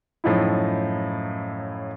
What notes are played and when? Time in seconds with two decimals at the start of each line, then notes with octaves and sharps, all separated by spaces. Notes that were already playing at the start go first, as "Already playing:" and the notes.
0.24 F#2 A2 F3 D#4 E4